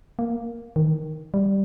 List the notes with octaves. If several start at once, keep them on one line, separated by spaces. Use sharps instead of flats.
A#3
D#3
G3